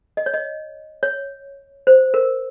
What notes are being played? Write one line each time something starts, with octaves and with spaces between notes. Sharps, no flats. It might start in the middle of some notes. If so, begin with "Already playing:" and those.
D#5
C#5
D#5
C#5
C5
A#4